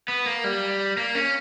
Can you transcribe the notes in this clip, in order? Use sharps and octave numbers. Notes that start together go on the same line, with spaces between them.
B3
A#3
G3
A#3
C#4